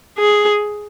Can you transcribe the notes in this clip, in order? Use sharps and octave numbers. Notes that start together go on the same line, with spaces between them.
G#4